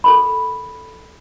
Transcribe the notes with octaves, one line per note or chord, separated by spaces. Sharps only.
A4 A#4 B5